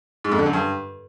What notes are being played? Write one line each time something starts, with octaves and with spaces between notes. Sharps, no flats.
G#2
F2
D3
F#2
G2